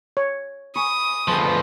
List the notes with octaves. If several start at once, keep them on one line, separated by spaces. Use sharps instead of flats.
C#5
G#5 B5 C#6 D#6
D2 F3 G#4 B4 D5